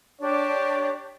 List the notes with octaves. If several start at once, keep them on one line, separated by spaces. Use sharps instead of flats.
D4 G4 C#5